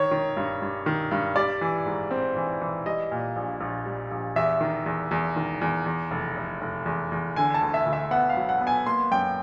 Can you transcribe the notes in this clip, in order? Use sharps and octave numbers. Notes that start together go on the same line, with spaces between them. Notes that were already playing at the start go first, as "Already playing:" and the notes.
Already playing: D#3 C#5
D#3
G2
G2
D#3
G2
G3 D5
E3
G#2
C4
E3
E3
G3 D#5
A#2
A#1
A#1
G3
A#1
E2 E5
D#3
E2
E2
D#3
E2
E2
F1
F1
F1
E2
E2
D3 G#5
A5
D2
E5
D2
E5
B3 F#5
F5
F#3
F#5
B3
G#5
A#3 C6
F#2 G5